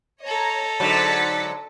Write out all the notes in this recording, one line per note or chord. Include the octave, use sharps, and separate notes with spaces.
A4 C#5 D#5 A#5
G#2 D3 F#3 A6 B6 C#7